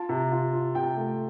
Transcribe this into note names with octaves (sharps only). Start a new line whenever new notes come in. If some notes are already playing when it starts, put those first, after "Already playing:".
Already playing: F4 A5
C3
F4
F4
C3 G5
A3